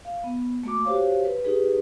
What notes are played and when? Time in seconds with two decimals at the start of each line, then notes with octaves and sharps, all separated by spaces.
0.05 F5
0.24 B3
0.64 A3 A#3 F#4 D6
0.85 F#4 G4 C5 C#5 F5
1.25 B4
1.44 D#4 G4 G#4 B4